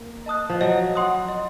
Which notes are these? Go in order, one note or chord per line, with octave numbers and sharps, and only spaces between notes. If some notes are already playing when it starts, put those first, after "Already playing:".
Already playing: A#3
D#5 A5 D#6 F#6
F3
F#3 D#5
F#5 C6 D#6 F#6
D#5